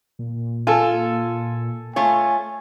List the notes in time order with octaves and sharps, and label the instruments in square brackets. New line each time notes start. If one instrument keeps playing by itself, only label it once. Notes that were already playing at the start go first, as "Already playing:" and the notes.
[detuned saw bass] A#2
[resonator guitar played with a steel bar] F4 [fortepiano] A4 G#5
[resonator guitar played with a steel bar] A3 F4 C#5 [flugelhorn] G#5